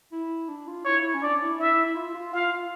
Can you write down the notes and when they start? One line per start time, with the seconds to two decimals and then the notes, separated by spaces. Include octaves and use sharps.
0.12 E4
0.49 D4
0.68 F4
0.85 E4 C#5
1.14 C#4
1.22 D4 D5
1.41 E4
1.59 E4 E5
1.86 E4
1.96 F4
2.15 F4
2.33 F4 F5
2.52 F4